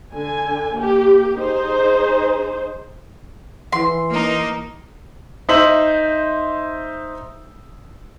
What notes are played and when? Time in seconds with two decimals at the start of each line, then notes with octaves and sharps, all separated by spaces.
0.13 D3 G#5
0.76 A#3 G4
1.36 D#4 G#4 C5
3.72 E3 C6
4.10 A#3 D#4
5.49 D#4 C5 E5 F#7